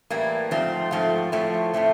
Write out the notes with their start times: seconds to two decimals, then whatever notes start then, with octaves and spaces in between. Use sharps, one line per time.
0.10 A2 E3 G3 A#3
0.51 G#2 F3 A3 C4 F4
0.91 G#2 F3 A3 C4 F4
1.32 A2 F3 A3 C4
1.74 A2 F3 A3 C4